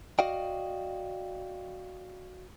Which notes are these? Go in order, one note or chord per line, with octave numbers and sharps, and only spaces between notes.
F#4 D5 D#5 F5 G5